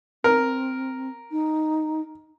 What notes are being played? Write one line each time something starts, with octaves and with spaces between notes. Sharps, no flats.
C4 A#4
D#4